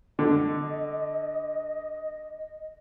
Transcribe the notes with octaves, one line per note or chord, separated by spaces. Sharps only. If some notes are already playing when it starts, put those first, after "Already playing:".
D3 D#5